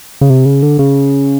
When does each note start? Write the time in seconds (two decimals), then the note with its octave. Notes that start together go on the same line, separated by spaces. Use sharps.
0.21 C#3
0.30 C3
0.46 C#3
0.63 D3
0.79 C#3